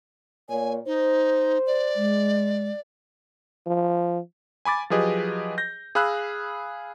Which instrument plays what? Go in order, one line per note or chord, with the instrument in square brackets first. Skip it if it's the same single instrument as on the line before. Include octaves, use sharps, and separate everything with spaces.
[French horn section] A#2 A#3 C#5 [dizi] G#5
[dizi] D#4 [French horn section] C5
[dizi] D5
[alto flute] G#3
[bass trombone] F3
[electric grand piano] G#5 B5 D6 A6
F3 F#3 G4 G#4 B4 D#5
G6 A#6
G#4 F5 B5 E6 F#6